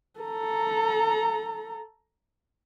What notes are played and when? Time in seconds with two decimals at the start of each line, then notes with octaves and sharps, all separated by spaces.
0.20 A4 A#5